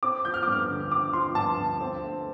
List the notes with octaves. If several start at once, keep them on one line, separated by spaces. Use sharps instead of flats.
C4 D6
F3 G6
F6
D6
G2
F6
D3
C4 D6
F3 C6
G2 A5
D3
C4
A3